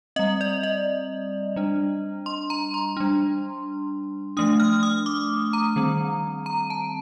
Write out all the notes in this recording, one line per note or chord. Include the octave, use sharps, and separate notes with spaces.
G3 C4 D#5
D5
D#5
G3 D4
C6
A#5
C6
G3 D4
F3 A3 D4 D#6
F6
D#6
D6
A#5
D#3 G3 C4
A#5
A5